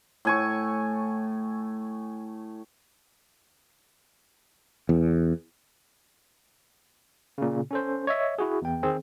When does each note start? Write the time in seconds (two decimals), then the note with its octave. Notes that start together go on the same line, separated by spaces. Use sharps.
0.25 A2 G#5 C#6
4.89 E2
7.38 A#2 C#3
7.71 C#4 A4 C5
8.07 C#5 D#5 E5
8.39 E4 F#4 G#4
8.62 E2 G5
8.83 D#3 C4 G#4